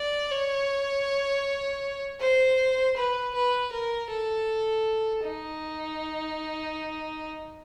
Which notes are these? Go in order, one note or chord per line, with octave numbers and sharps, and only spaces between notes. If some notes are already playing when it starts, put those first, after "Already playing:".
Already playing: D5
C#5
C5
B4
B4
A#4
A4
D#4